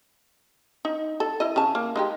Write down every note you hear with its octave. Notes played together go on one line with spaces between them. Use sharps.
D#4
A4
E4 D#5
C#3 G#5 A5
A#3
G#3 D#4 G4